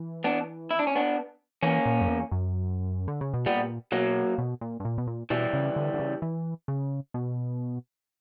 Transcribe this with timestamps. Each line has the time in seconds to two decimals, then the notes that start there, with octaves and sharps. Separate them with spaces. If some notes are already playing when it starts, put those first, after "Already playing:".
Already playing: E3
0.24 B3 D4
0.71 E4
0.79 D4
0.87 C#4
0.96 B3 D4
1.63 E3 A#3 C#4
1.86 A#2
2.01 F#2
2.08 E2
2.31 F#2
3.08 D3
3.21 C#3
3.34 B2
3.46 A#2 G3 B3
3.92 B2 F#3 A#3
4.38 B2
4.61 A#2
4.80 G2
4.85 A#2
4.98 B2
5.07 A#2
5.30 B2 E3 G3
5.53 C#3
5.76 D3
5.94 D3
6.00 C#3
6.22 E3
6.68 C#3
7.14 B2